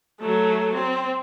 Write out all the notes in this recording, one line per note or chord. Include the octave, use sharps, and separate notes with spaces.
F#3 A3
C4